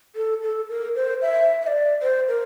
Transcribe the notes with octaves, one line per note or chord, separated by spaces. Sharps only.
A4
A4
A#4
C5
E5
E5
D5
C5
A#4